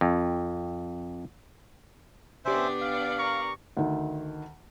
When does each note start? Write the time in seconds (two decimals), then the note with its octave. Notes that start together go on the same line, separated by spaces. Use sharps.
0.01 F2
2.45 C3 B3 C#4 D4 G4 C5 D5 E5
2.81 F5
3.18 A#4 A#5 C#6
3.77 D2 D#3